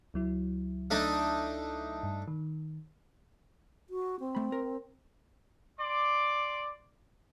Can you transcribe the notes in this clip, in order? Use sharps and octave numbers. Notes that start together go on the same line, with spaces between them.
C#2 F#3 E4
A3 D4 D#4
G2
D#3
F#4
C4
A3 B5
A#4
D5 C6 D6